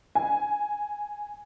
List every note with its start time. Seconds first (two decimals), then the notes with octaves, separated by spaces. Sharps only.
0.15 G#5